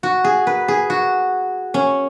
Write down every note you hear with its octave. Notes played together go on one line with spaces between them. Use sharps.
F#4
G#4
B4
G#4
F#4
C#4